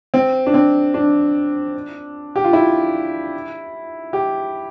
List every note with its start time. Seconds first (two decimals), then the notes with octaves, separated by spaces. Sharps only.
0.14 C4
0.47 D4
0.54 C4
0.94 D4
2.36 G4
2.44 F4
2.53 E4
4.13 G4